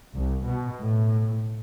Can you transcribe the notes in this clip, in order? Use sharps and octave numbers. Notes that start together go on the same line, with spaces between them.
C2
B2
A2